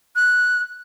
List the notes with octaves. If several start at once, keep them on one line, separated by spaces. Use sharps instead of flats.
F#6